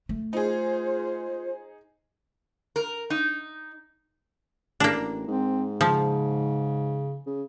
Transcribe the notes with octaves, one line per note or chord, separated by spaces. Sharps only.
A3
D#4 F4 G#4 C5
A#4
D#4
A1 A#3 D4
G#2 C4
C#3 F3
C#3